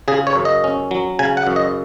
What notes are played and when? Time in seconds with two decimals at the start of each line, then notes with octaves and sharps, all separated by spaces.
0.08 C#3 G#4
0.27 C#5
0.36 F#2
0.45 D#5
0.64 C#4
0.91 F#3
1.19 C#3 G#5
1.37 F#5
1.47 F#2
1.56 D#5